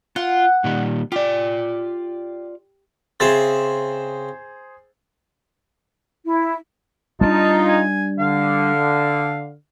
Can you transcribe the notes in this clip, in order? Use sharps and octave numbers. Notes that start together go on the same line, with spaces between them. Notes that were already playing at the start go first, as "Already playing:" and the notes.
F4 F#5
A#2 D#3 G3
F4 G4 D5
C#3 C4 G#4 C5 E5 A6
E4
G3 G#3 D4 D#4 F4 A5
G#5
D3 F5